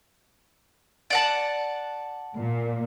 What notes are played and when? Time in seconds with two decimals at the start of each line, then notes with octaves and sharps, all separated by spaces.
1.10 D5 F#5 A5
2.36 A#2